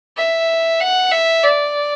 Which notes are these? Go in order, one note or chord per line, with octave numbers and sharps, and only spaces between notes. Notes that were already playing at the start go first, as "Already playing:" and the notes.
E5
F#5
E5
D5